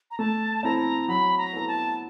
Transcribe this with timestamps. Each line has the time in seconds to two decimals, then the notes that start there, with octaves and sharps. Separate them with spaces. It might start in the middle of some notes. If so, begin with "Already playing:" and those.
0.11 A#5
0.18 A3 A5
0.63 C4 E4 A4 A#5
1.08 F#3 B5
1.38 A#5
1.53 B3 E4 A4
1.68 A5